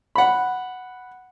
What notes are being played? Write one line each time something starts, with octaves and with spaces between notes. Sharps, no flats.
F#5 B5